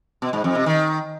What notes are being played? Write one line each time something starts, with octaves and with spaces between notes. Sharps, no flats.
B2
G#2
F2
C3
D#3